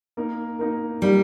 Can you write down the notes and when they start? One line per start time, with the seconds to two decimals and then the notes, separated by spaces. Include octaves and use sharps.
0.17 A#3 D#4 A#4
0.59 A#3 D#4 A#4
1.02 G3 A#3 D#4 A#4